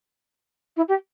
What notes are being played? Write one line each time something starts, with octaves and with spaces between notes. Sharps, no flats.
E4
G4